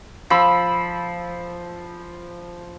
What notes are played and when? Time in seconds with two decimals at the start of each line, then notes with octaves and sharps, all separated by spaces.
0.30 F3 B5 E6